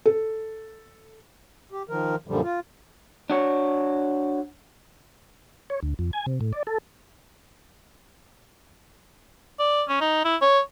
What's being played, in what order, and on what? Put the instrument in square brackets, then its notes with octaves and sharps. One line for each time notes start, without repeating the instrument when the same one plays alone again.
[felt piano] A4
[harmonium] G4
D#3 F3 A#4
F#2 A#2 D3 F3 G3
F4
[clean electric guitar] D4 F#4 C#5
[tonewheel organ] C#5
D2
F2
G#5
C3
A2
D5
A4
[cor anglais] D5
C#4
D#4
E4
C#5